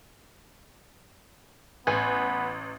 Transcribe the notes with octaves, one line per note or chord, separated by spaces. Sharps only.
A1 B3 B4 F#5 G#5